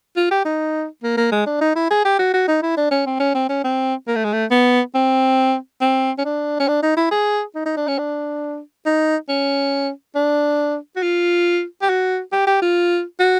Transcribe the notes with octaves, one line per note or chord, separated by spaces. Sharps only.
F4
G4
D#4
A#3
A#3
G#3
D4
D#4
E4
G#4
G4
F#4
F#4
D#4
E4
D4
C#4
C4
C#4
C4
C#4
C4
A#3
A3
G#3
A3
B3
C4
C4
C#4
D4
C#4
D4
D#4
E4
G#4
D#4
D#4
D4
C#4
D4
D#4
C#4
D4
F#4
F4
G4
F#4
G4
G4
F4
F#4